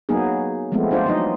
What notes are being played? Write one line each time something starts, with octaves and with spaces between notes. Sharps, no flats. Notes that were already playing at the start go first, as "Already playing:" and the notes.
F#3 A#3 B3 D#4 G#4
F3 G#3 A3 B3 C4
D4 F4 C5 D5
E3 F#3 D#4 D#5